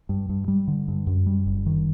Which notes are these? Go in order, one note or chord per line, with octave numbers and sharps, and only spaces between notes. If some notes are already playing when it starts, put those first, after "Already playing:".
G2
G2
G3
D3
G2
F#2
G3
F#1
D#3